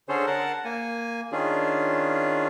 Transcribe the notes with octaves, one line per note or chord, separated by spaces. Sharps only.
D3 C#4 G#4 A4 C5 C#5
A#4 F#5 A5
A#3 G#5
D#3 C#4 D4 F4 G#4